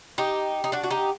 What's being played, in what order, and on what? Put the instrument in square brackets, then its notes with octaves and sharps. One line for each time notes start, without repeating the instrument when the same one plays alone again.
[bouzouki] D#4 G4
D#4
D4 F#4
F#4
D#4 G4